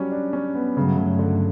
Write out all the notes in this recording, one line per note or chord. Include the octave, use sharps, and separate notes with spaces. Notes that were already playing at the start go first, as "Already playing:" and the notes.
Already playing: F#3 G3 C#4
D4
C#4
B3
G2 C#3 F#3 A3
C#3
D3